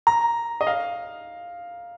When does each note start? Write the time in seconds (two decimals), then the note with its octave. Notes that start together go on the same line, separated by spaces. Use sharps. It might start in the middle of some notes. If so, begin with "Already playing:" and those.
0.07 A#5
0.61 D#5
0.67 F5